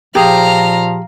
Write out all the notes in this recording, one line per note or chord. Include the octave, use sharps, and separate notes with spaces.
A#2 F3 G4 G#4 F5 A#5